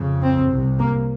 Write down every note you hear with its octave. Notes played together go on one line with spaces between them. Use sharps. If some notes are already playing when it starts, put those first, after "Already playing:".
Already playing: F2 C#3
C4
C2 C3
A#3